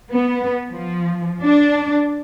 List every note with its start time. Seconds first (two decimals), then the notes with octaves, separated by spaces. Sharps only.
0.12 B3
0.69 F3
1.41 D4